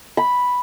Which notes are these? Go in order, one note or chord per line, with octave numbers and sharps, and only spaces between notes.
B5